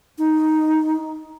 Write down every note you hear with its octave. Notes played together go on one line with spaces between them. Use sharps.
D#4